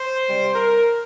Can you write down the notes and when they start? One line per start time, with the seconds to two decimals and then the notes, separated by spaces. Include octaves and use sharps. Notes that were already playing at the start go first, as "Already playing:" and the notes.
Already playing: C5
0.28 C3 G3
0.55 A#4